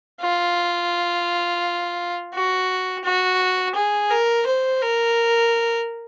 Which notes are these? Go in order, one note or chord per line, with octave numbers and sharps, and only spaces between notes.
F4
F#4
F#4
G#4
A#4
C5
A#4